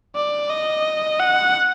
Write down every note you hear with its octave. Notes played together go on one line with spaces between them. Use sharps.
D5
D#5
F#5